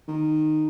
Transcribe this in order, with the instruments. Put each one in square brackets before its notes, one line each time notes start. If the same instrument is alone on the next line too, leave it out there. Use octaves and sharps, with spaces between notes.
[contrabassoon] D#3